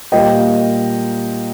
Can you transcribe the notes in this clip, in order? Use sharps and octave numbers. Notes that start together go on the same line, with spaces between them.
A#2 G3 A#3 D#5 G5